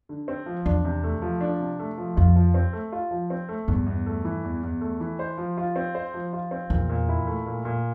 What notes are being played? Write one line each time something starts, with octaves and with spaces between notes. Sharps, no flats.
D3
C4
F3
E2 D4
C3
A3
F3
D4
C3
A3
F3
F2 F4
F3
C4
A3
F4
F3
C4
A3
E2 G2
E2
A3
E3
E2
E2
A3
E3
C5
F3
F4
C4
C5
F3
F4
C4
E2 A#2
A#2
E4
A3
A#2
A#2